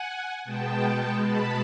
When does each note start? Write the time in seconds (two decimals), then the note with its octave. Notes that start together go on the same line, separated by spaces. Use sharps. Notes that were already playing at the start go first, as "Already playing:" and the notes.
Already playing: F#5 G#5
0.43 B2 G#3 B3 G5 A5
1.23 A5 B5